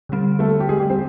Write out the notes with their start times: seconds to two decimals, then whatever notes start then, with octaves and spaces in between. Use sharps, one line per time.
0.09 D3 G3 C4
0.39 A3 A4
0.60 G4
0.69 G#3 G#4
0.80 G3 G4
0.90 C4 C5